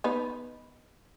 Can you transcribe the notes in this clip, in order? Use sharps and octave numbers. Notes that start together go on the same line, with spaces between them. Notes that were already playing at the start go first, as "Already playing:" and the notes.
B3 D#4 B4